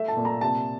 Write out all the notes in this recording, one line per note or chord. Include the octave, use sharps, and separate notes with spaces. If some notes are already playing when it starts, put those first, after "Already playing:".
Already playing: A3 E5
A5
A#2
A#5
C3 A5